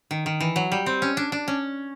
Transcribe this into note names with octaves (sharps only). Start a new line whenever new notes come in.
D#3
D#3
E3
F#3
G3
C4
C#4
D4
D4
C#4